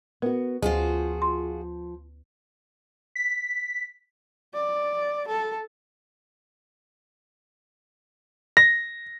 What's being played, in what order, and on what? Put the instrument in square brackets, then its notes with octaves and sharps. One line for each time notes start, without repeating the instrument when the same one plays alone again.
[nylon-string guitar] B3 F#4 [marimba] A#4
[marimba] D2 [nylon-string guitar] F3 [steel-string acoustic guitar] F4 F#4 G#4
[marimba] C6
[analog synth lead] B6
[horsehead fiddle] D5
A4
[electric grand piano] A#6